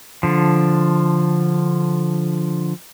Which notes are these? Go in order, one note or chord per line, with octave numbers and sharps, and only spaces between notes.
D3 F3